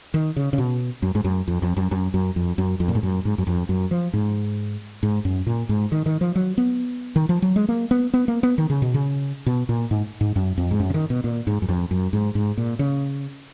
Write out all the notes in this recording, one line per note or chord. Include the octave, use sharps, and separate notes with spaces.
D#3
C#3
C#3
B2
F#2
G#2
F#2
F2
F2
F#2
F#2
F#2
F2
F#2
F2
A#2
G#2
F#2
G#2
F#2
F2
F#2
F3
G#2
G#2
F#2
A#2
G#2
D#3
D#3
F3
F#3
B3
D#3
F3
F#3
G#3
A#3
B3
B3
A#3
B3
D#3
C#3
B2
C#3
B2
A#2
G#2
G#2
F#2
F2
G#2
F#2
C#3
D#3
B2
A#2
G#2
F#2
F2
F#2
G#2
G#2
A#2
C#3